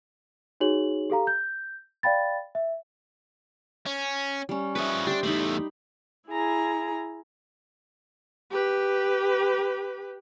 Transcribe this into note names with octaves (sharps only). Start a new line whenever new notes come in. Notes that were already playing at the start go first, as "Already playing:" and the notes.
D#4 F#4 G#4 C#5 F#7
G4 A4 F5 A#5
G6
D5 F5 G5 B5 A6
E5
C#4
G3 C#4
F3 B4 C#5 D#5 E5
D4 G4 C5 G5
E2 A3 D#4 B5 C6
E4 G#4 A#5
G4 B4